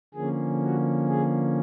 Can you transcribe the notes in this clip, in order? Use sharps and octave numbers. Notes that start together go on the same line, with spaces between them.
D3 F3 A#3 C#4 G#4
F#4
G#4